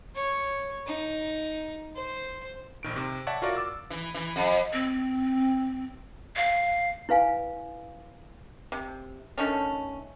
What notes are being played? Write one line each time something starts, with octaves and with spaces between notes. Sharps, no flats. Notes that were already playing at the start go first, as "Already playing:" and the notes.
C#5
D#4
C5
A#1 D#3 D7
C3
C#5 D5 E5 F#5 A5
F4 F#4 A#4 D5
D6 E6 A6
E3
E3
F2
C4
F5
E4 B4 F5 G#5
C3
D3 D#3 A3 C#4